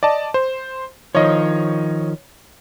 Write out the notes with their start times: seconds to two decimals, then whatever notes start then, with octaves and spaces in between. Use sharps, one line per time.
0.03 D5 D#5 A5
0.34 C5
1.15 D#3 F3 C#5 D#5